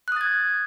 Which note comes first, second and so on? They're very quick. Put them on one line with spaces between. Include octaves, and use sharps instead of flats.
F#6 D#6 A6 G#6